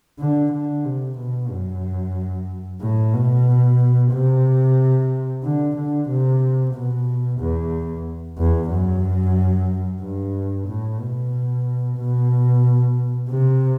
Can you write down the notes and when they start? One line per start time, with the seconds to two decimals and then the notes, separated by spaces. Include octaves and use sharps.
0.19 D3
0.52 D3
0.85 C3
1.18 B2
1.50 F#2
2.81 A2
3.14 B2
4.12 C3
5.43 D3
5.76 D3
6.08 C3
6.74 B2
7.40 E2
8.38 E2
8.70 F#2
10.01 G2
10.67 A2
11.00 B2
11.98 B2
13.30 C3